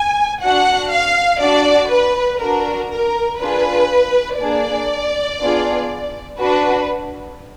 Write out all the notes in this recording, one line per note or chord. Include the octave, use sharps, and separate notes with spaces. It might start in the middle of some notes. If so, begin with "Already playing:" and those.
Already playing: G#5
D4 F#4 F#5
F5
D4 F#4 D5
B4
D4 F#4 A#4
A#4
D4 F4 G#4 B4
A#3 D4 G#4 D5
B3 D4 F4 G#4
D4 F#4 B4